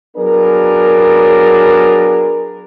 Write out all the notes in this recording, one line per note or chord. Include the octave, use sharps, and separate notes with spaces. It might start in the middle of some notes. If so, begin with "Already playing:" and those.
F#3 B3 D4 G#4 A#4